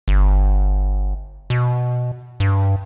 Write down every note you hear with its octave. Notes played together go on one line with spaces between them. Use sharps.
G1
B2
G2